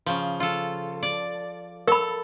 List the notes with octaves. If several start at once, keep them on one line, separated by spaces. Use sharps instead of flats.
C#3 F3
F4 A4
D5
A4 A#4 B5